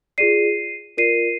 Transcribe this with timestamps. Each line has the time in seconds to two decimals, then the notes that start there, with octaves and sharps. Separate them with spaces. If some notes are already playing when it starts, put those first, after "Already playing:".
0.18 F4 G#4 D5 C7 D#7
0.97 F4 A#4 D5 C7 D#7